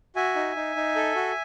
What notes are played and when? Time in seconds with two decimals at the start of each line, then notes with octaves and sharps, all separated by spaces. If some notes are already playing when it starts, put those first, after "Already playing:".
0.16 F#4 E5 G#5
0.35 D#4
0.56 D#4
0.76 D#4
0.96 A4
1.16 F#4